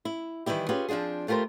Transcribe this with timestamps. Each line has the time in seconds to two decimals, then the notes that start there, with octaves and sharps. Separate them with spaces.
0.05 E4
0.46 D#3 E3 G3 E4 G4
0.69 C#4 F4 G4 G#4 B4
0.89 F3 C4 D4 F4 G#4
1.28 A3 F4 G4 A#4 C5